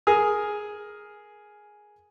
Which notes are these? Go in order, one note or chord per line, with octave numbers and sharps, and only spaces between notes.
G#4 A#4 G#5 D#6 F6